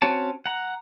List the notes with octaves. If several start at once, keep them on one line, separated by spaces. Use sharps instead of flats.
C4 C#4 F#4 C#5 A5
F#5 A#5